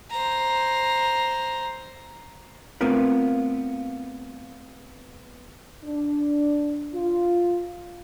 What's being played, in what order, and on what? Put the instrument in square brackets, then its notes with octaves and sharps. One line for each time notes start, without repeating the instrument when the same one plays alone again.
[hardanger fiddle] C5 A#5
[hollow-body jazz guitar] A3 B3 C4 F4 A#4 B4
[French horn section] D4
F4